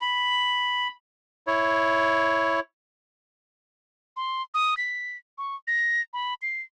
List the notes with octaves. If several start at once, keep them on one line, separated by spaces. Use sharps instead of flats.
B5
E4 C#5
C6
D#6
B6
C#6
A#6
B5
C7